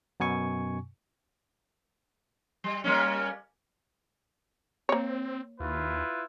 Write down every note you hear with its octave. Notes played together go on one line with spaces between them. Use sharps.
F#2 B2 G#5 C#6
G3
G3 A#3 C#4
A#3 C4 C#5
D#2 E4 F4 B4